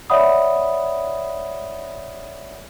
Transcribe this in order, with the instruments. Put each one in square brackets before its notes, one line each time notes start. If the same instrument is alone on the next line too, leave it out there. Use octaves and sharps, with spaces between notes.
[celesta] C#5 D5 E5 F#5 B5 D#6